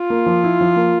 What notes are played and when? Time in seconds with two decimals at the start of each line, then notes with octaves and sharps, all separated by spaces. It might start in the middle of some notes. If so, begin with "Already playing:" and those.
Already playing: F4
0.10 A#3
0.26 F3
0.44 E4
0.61 F3
0.76 A#3